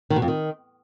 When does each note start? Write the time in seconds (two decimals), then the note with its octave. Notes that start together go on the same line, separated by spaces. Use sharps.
0.10 D#3
0.16 B2
0.22 F2
0.28 D#3